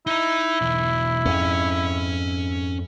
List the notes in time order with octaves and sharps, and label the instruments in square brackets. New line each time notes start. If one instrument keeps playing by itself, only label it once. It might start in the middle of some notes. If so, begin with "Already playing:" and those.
[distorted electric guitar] D#4 A#5 [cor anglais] E4
[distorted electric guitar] B1 E2
[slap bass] F2 G#2 [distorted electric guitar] C#4